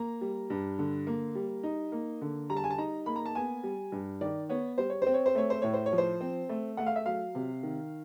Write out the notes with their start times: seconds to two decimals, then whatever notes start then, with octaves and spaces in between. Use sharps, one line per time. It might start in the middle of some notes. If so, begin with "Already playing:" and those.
Already playing: A#3 A#5
0.21 G3
0.50 G2
0.78 D3
1.07 A#3
1.35 G3
1.63 D#4
1.92 A#3
2.21 D3
2.50 G3 A#5
2.57 A5
2.64 G#5
2.70 A5
2.78 D#4 A#5
3.06 A#3 B5
3.16 A#5
3.26 A5
3.35 B3 G#5
3.64 G3
3.92 G2
4.21 D#3 D5
4.49 B3 C#5
4.78 G3 C5
4.90 C#5
5.02 C4 C5
5.14 C#5
5.26 C5
5.35 A3 C#5
5.50 C5
5.62 A2 C#5
5.73 C5
5.86 C#5
5.93 F3
5.98 C5
6.21 C4
6.49 A3
6.77 A3 F#5
6.86 F5
6.96 E5
7.06 F#3 F5
7.35 C3
7.63 D#3